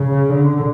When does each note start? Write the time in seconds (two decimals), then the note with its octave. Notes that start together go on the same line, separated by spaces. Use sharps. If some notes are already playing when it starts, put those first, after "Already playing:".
Already playing: C#3
0.29 D3